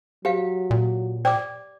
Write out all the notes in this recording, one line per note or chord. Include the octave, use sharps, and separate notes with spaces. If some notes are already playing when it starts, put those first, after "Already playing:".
F#3 G4 F5
A#2
D5 G5 D6